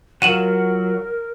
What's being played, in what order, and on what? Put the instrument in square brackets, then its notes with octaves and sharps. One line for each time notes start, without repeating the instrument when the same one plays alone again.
[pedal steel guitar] F#3 [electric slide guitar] F4 F#4 F#5 [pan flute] A#4 [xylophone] D#7 E7 F#7